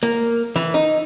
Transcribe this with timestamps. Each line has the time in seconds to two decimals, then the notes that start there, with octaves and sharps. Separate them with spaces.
0.03 A#3
0.56 E3
0.74 D#4